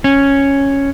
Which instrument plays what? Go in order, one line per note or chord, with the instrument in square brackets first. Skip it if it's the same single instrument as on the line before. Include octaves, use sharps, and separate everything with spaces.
[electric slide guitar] C#4